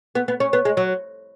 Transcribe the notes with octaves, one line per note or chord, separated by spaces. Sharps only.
B3
B3
C#4
B3
G#3
F#3